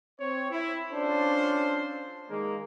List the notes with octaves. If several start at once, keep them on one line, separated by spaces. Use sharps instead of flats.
C4 C#5
E4
C#4 D4 F4 A4 C5
D#3 G#3 A#3